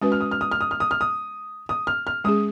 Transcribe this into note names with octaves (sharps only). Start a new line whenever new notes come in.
G#3 C#4 F#4 B4 D#6
F6
D#6
F6
D#6
F6
D#6
F6
D#6
F6
D#6
D#6
F6
F6
G#3 C#4 G#4 D#6